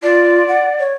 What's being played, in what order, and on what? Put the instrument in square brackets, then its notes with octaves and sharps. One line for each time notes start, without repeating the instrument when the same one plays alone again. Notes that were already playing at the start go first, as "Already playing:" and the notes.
[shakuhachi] F4 [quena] D5
[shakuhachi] F#5
C#5